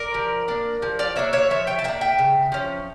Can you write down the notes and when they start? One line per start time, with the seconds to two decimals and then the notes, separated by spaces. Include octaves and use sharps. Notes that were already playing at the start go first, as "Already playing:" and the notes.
Already playing: A#4 D5
0.14 F3
0.48 A#3 D4
0.82 F3
0.99 D5 F5
1.16 A#3 D4 C#5 E5
1.33 C#5 E5
1.50 F3 C#5 E5
1.67 E5 G5
1.79 A5
1.84 A#3 E5 G5
1.88 D4
2.01 E5 G5
2.19 C#3
2.52 F3 C#4